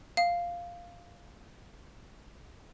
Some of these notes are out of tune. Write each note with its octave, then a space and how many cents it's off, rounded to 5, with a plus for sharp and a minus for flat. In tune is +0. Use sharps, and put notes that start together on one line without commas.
F5 -5